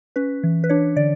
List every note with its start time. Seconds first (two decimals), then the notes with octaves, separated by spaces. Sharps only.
0.16 C#4 B4
0.43 E3
0.64 B4
0.69 D4 C#5
0.96 D3 D5